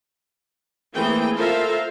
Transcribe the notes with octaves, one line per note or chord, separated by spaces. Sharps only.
E3 A3 A#3 C4 G#4 G5
F4 A4 A#4 C5 E5 F5